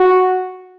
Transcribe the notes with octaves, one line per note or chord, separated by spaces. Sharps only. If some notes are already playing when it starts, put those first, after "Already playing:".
Already playing: F#4